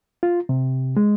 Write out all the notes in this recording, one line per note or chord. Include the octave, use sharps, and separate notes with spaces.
F4
C3
G#3